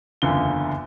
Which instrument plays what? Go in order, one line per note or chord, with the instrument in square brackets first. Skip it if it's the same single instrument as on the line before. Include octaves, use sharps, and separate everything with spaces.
[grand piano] F#1 E2 D3 F4 G7